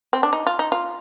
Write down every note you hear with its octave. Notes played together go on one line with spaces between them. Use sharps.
C4
D4
D#4
F4
D#4
F4